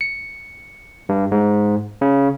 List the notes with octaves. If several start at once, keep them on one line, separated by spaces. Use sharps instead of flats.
C#7
G2
G#2
C#3